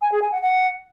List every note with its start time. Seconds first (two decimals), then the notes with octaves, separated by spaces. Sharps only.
0.02 G#5
0.12 G#4
0.22 G#5
0.32 F#5
0.42 F#5